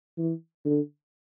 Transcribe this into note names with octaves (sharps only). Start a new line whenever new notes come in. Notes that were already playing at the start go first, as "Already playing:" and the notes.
E3
D3